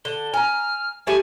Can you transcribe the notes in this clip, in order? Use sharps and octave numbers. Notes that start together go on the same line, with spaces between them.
D3 G7
G#5 A#5 F6
G3 A3 E4 G#5